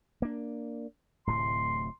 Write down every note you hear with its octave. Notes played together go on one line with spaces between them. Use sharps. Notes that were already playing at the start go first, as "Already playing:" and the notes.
A#3 D4
D1 A2 C3 C6